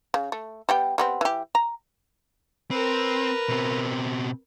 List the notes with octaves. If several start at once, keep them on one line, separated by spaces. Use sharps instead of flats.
C#3
A3
G3 B3 G5
G3 B3 C4
E3 G4
A#5
C4 A#4 B4
B2 C4